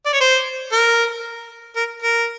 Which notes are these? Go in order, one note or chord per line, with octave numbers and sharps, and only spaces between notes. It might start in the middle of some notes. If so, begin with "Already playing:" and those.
D5
C#5
C5
A#4
A#4
A#4